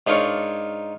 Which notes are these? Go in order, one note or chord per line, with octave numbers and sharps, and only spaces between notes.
G#2 D4 D#4 F4 A#4 C#5